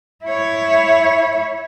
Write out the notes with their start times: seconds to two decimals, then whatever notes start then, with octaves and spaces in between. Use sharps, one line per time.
0.25 E4 C#5